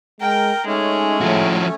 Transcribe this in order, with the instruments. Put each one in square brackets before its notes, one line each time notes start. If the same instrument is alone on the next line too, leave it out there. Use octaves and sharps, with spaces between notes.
[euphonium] G#3 [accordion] A#4 [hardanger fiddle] G5
[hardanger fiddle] G#3 [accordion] A3 C#4 [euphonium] D#4
[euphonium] A2 [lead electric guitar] F3 F#4